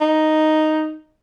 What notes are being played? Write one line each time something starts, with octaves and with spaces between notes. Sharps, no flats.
D#4